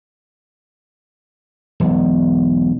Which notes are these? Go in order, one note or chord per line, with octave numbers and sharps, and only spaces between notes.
E1 B1